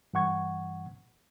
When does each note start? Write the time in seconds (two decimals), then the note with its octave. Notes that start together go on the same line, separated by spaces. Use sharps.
0.13 G2 E3 F#5 C#6 G#6